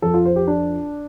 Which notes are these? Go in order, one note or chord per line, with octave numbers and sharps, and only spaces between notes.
F2 F3 A4
F4
C5
G4
D4